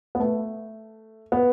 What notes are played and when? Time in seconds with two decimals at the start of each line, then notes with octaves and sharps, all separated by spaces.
0.15 B3
0.20 A3
1.32 B3